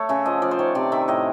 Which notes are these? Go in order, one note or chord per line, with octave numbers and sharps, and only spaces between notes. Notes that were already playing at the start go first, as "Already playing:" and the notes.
Already playing: A3 C#5
C#3 E5
F3 D#5
F3 D5
C5
D#3 C#5
C3 D5
D#3 E5
A2 D#5